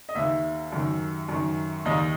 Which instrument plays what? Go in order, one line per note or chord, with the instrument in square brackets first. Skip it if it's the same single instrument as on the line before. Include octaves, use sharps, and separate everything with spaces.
[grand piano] D#5
D#2 D#3 E5
F#2 D#3
F#2 D#3
D#2 D#3 D#5